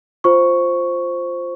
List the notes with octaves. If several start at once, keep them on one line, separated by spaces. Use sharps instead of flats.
F4 C5 C#6